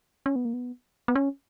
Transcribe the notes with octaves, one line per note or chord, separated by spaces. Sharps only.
C#4
B3
A#3
B3
B3
C#4